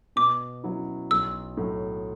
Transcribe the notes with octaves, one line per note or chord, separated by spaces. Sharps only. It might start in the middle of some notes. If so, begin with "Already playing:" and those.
B2 D6
F#3 C#4 E4
B1 E6
A2 F#3